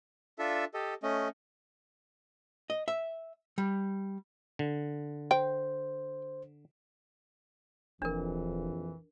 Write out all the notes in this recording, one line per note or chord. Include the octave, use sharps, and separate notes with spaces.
D4 F4 A4 E5
G4 A4 D#5
A3 C#4 D#5
D#5
E5
G3
D3
C5 G5
F1 A#1 F2 E3 D4 A#4